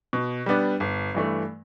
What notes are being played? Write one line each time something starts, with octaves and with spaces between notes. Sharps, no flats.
B2
G3 B3 D4
G1
G2 E3 A3